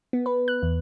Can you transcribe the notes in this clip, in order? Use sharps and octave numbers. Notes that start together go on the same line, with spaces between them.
B3
B4
F#6
E2